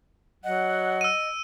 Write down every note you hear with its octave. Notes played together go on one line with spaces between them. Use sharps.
F#3 D#5 F#5
E6 D#7